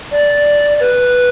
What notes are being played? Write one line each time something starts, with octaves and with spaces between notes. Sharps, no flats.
D5
B4